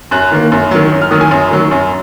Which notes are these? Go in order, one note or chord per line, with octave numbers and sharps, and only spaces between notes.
F#2 F#6
D#3 A#3
F#2
D#3 F#3
F#2
F6
D#3 F#3 D#6
G#5
F#2
D#3 F#3
F#2